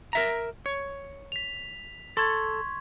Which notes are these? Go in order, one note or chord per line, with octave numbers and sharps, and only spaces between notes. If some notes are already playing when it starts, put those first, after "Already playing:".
A#4 E5 A#5
C#5
B6 F7
A4 C6 C#6 G#6